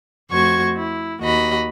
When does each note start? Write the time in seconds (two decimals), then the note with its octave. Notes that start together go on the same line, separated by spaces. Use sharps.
0.31 F2 A3 F#4 C5 C#6 G#6
0.76 E4
1.20 D#2 F#4 D#5 B5